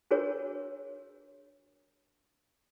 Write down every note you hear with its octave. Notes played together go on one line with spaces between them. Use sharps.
D4 F#4 G#4 A#4 C#5